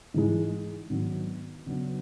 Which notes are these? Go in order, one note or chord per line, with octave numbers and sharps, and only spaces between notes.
G#2 E3 G#3
G#2 D#3 F#3 B3 D4
C#3 F#3 B3 D4